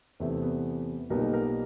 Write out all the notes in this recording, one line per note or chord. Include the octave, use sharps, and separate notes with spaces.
E2 C3 E3 A3 C4 E4 E5
B3 B4
B1 A#2 G3 B3 D#4 A#4
A4
A#3 A#4